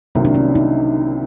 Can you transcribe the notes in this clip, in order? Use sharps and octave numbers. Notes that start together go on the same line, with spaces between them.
C2 C3 D#3 F#3 A#3 C4
D4
C#4
D#4